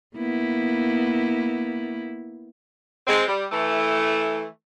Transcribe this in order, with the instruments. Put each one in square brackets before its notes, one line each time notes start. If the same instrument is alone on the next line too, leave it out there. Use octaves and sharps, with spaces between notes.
[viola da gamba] A#3 B3 E4
[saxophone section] G#3 C4
G3
E3 A3